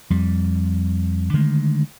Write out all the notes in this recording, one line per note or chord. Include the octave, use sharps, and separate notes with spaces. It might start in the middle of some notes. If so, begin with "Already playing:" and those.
F2 G3
D3 D#3 G#3 A3